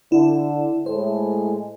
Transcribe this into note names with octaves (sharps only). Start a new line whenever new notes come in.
D3 E4
A2 G#3 C5